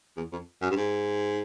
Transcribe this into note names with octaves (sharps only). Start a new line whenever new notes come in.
E2
F2
F#2
G2
G#2